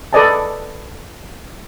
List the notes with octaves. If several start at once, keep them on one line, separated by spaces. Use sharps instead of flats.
A4 B4 D5 D#5 G#5 A5